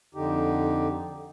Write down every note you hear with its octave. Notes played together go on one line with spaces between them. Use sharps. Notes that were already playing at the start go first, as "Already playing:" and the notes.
F2 D3 D#4 G4